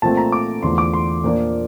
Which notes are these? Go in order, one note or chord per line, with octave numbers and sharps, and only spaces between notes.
A#2 F3 A3 C4 A5
A#5
D6
E2 D3 F3 A3 C6
D6
C6
A#2 F3 A#3 D4